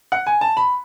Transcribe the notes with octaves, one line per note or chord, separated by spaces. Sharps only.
F#5
G#5
A5
B5